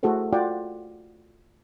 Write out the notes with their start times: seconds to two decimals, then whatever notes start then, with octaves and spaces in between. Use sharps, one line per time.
0.03 A3 E4 F#4 G#4 A4 C5
0.33 F4 F#4 D5 F#5 G5